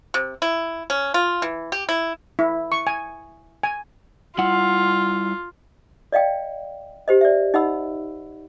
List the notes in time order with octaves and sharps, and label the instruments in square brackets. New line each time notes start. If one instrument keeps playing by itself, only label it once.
[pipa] C3
E4
C#4
F4
E3
G4
E4
[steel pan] E4
C#6
G#5
G#5
[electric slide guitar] G3 E4 F#5 [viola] F4
[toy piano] D5 D#5 F5 G5
G4 C5 D#5
D5 E5
D#4 D#5 F#5 B5 E6